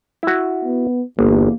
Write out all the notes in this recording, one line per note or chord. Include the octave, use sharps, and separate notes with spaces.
E4 F#4
B3
G1 E2 A#3